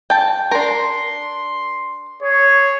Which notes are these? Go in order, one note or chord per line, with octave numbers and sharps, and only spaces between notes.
G5 A5
D4 A#4 C6
G#4 C#5